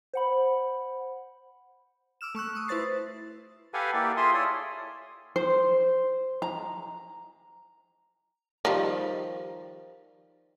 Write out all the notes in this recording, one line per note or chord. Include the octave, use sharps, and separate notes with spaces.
C5 F#5 B5
D6 E6 F6 E7
A3 C#6 E6 F#6
C#6 D#6
E4 B4 C5 A6 C7
G4 A4 B4 F5 F#5 G#5
A#3 E4 G4 D5
F4 G#4 A4 E5 C6 D#6
E4 C#5 D5 D#6
C5
A#5
D#3 F3 G3